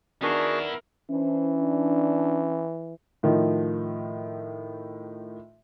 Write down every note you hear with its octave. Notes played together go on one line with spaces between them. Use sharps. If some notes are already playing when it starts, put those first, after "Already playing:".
D#3 B3 D4 E4 F#4 G#4 A#4
E3 C#4 D4 E4 C5
D4
A2 D#3 F3